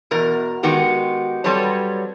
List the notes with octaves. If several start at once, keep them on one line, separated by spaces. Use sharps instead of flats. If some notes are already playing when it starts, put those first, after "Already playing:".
E2 B2 A#4
D#3 G#3 B3 F#4 G4
F#3 G3 C4 A4 B4 C#5